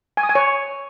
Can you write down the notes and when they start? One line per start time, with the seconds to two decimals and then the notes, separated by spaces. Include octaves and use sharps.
0.17 G#5
0.23 D#6
0.29 G#5
0.35 C#5